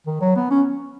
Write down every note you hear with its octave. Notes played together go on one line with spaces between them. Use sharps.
D#3
F#3
B3
C#4